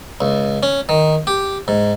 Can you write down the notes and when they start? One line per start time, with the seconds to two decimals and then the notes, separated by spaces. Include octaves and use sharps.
0.21 C#2
0.63 C#4
0.89 D#3
1.27 G4
1.68 G#2